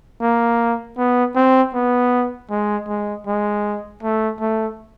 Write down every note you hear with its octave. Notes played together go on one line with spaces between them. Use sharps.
A#3
B3
C4
B3
G#3
G#3
G#3
A3
A3